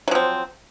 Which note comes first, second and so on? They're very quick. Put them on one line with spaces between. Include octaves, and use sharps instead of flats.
F#3 F3 C4